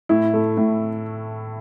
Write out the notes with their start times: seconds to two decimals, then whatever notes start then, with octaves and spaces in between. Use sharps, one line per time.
0.09 A2 E4
0.34 A3
0.57 A2